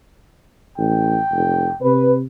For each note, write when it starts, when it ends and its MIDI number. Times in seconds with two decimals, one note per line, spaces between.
0.78 1.18 33
0.78 1.77 79
1.32 1.69 29
1.82 2.24 48
1.82 2.13 71